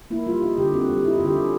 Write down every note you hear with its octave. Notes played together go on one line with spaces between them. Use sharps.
A#3 E4
G3 F4
D#4 F4
D3 G4
C4 F#4
G3
D#4 E4
F4
D3
G4
C#4